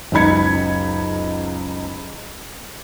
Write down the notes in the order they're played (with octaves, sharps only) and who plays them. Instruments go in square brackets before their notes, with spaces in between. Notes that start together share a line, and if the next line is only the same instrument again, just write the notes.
[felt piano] F#1 C#2 D#4 B5 G#6 C#7